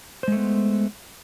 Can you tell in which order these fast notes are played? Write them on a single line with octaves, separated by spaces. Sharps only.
C5 G#3 A3 B3